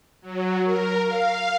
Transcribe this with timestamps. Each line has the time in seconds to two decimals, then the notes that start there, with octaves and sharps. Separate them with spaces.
0.21 F#3
0.64 A#4
1.04 F5